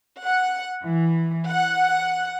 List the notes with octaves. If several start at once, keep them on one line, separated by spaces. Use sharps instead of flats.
F#5
E3
F#5